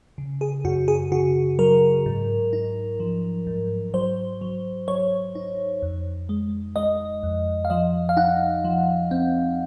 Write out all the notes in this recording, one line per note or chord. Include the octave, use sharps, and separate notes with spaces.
C#3
G#4
F#2 F#4
G#4
C#3 F#4
F#3 A#4
G#2
D#4
F3
G#2
F#3 C5
F#3
F#3 C#5
D#4
F2
G#3
G#3 D#5
F2
F5
F3 D#5
F5
D#4 F#5
F3
C4